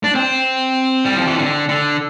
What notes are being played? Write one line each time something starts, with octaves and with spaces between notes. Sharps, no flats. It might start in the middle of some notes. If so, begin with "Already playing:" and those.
D4
C4
G3
F3
E3
D3
D3